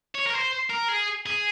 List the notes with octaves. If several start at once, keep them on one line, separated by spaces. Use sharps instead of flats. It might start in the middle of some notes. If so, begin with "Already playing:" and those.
C#5
A#4
C5
A#4
G#4
G#4